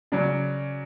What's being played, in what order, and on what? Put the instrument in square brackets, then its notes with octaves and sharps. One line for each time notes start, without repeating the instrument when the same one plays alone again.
[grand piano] C#3 F#3 D5